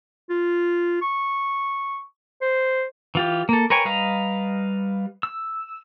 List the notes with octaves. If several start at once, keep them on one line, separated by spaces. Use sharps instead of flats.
F4
C#6
C5
E3 F4 G4
A#3 A4
A#4 B4 C#5 G5 G#5
G3 B4 D#5 F5 A#5
E6